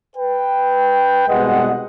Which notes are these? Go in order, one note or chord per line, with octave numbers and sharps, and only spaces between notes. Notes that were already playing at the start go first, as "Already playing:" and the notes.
B4 G5
C2 B2 G#3 D#5 F#5